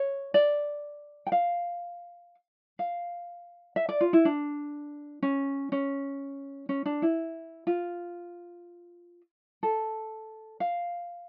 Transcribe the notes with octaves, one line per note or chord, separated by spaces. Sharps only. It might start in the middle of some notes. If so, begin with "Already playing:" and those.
Already playing: C#5
D5
G5
F5
F5
E5
D5
F4
E4
D4
C#4
C#4
C#4
D4
E4
F4
A4
F5